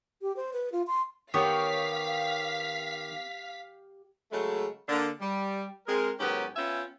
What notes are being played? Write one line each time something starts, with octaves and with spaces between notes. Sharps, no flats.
G4
C5
B4
F4
C6
D#3 B3 G4 C#5 F5 G5 B6
C#3 F#3 G#3 A3
D3 A#3
G3
G#3 C4 G#4 A#4
G#2 D#3 F#3 B3 C#4 G4
B3 C#4 F4 E5 G5 G#5